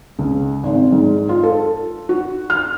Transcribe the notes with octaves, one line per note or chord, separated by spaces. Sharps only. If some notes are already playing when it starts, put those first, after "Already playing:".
C#2
G#1
G#2
F4
A4
F#4
F6